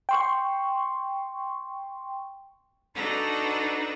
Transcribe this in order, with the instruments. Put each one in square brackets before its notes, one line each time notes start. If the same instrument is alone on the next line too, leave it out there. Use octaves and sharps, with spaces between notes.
[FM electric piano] G5 C6 C#6
[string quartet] D4 D#4 F#4 A4 B4 A#5